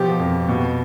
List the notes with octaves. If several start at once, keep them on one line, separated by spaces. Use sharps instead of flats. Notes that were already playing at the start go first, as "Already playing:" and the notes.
Already playing: B2 F3 G4
F2
B2